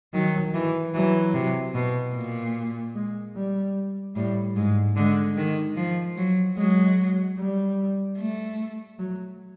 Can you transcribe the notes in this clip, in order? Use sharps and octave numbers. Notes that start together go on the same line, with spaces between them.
D#3 F#3
E3
E3 F#3
C3
B2
A#2
G#3
G3
A2 G3
G#2 G#3
D3 G#3
D#3
F3
F#3
F#3 G#3
G3
A3
F#3